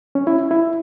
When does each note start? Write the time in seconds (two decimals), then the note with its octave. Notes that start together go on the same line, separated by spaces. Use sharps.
0.15 C#4
0.27 E4
0.51 E4